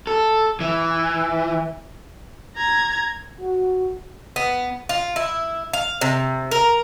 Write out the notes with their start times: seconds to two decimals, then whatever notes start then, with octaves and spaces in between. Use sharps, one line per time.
0.07 A4
0.60 E3
2.57 A#5 G#6
3.41 F#4
4.36 B3
4.89 F4
5.16 E4
5.73 F5
6.01 C3
6.51 A#4